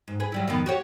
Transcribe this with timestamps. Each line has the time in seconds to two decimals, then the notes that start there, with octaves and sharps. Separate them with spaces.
0.08 G#2
0.20 G#4 B4
0.32 F#3 G3 E4
0.47 F2 D#3 B3
0.66 F#4 G4 C#5